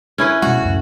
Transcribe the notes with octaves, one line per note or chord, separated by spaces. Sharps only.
C#4 E4 B4
B2 G#3 F#4
C#2 F#2 A2